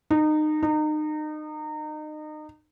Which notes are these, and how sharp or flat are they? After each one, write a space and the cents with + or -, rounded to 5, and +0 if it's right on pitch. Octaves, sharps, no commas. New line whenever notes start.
D#4 -25
D#4 -30